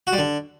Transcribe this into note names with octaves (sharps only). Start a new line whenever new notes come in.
F#4
G3
D3